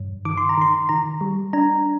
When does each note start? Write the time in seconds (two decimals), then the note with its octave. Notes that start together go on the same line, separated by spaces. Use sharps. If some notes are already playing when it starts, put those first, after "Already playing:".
Already playing: G2
0.25 D#3 D6
0.37 C6
0.49 A#5
0.58 D#3 C6
0.89 D#3 A#5
1.21 G3
1.53 D4 A#5